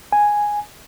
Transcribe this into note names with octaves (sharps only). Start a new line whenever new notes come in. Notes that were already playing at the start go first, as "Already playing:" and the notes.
G#5